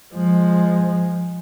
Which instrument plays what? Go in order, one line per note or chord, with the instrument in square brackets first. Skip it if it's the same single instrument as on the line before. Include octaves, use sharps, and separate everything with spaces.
[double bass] F3 G#3